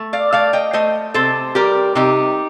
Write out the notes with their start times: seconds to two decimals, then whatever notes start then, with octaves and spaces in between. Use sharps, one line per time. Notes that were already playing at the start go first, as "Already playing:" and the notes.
Already playing: A3
0.13 D5 F5
0.33 A3 D5 F5
0.53 D#5 G5
0.73 A3 C5 D#5
1.14 C3 A4 C5
1.55 G3 G4 A#4
1.95 C3 D#4 G4